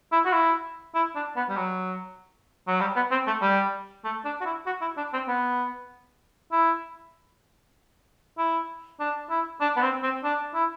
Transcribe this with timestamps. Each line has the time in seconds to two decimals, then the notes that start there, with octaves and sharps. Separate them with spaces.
0.12 E4
0.26 F#4
0.33 E4
0.95 E4
1.16 D4
1.36 B3
1.49 G3
1.57 F#3
2.68 F#3
2.81 G3
2.96 B3
3.11 C4
3.27 A3
3.42 G3
4.04 A3
4.25 D4
4.41 F#4
4.46 E4
4.67 F#4
4.82 E4
4.97 D4
5.13 C4
5.28 B3
6.52 E4
8.38 E4
9.00 D4
9.30 E4
9.61 D4
9.77 B3
9.82 C4
10.03 C4
10.24 D4
10.55 E4